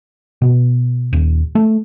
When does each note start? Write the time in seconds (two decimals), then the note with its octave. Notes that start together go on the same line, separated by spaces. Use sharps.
0.42 B2
1.13 D#1
1.55 A3